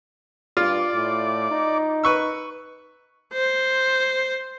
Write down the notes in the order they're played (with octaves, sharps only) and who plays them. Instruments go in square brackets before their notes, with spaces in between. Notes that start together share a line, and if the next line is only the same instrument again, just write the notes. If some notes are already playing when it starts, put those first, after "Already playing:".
[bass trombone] G2 [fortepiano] F4 [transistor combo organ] D5
[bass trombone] A2
D#4
[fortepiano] B4 C#6 E6
[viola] C5